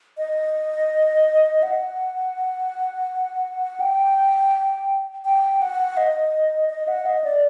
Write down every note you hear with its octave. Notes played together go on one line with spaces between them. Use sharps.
D#5
F#5
G5
G5
F#5
D#5
D#5
F#5
D#5
D5